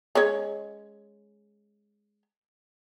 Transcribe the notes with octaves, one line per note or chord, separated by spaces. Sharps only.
G#3 C#4 C#5